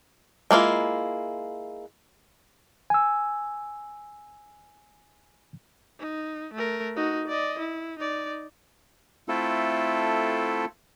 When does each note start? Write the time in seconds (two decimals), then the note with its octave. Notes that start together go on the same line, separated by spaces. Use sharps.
0.51 G#3 A#3 E4 F4
2.90 G#5 E6
6.00 D#4
6.54 A3 A#4
6.97 D#4 F#4
7.28 D5 D#5
7.59 E4
7.99 D#4 D5
9.29 A3 C4 E4 F4 A4